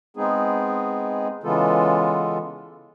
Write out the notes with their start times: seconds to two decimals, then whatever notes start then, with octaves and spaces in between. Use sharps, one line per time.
0.17 G#3 B3 C4 D#4 G#4
1.44 C#3 E3 G#3 B3 F4 A4